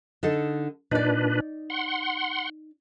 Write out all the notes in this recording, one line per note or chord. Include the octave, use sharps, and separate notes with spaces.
D3 D#4 A4
A#2 D4 D#4 B4 D5
F#5 C6